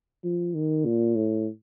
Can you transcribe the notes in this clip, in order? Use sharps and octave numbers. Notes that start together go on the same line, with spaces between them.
F3
D#3
A#2
A2